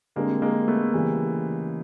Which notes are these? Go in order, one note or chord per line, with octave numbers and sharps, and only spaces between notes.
D3 G3 G#3 A#3 C4
G#3 A#3
A3 B3
C#3 E3 G3